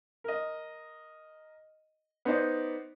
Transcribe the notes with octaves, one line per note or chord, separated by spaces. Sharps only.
A#4 D#5
B3 D#4 C5 D5